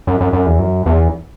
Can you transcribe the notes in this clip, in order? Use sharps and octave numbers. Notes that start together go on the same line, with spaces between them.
F#2
F#2
F#2
E2
F#2
E2